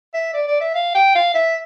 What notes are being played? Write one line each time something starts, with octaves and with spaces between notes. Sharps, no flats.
E5
D5
D5
E5
F5
G5
F5
E5